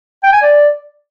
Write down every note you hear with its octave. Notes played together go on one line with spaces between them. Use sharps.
G5
G#5
D5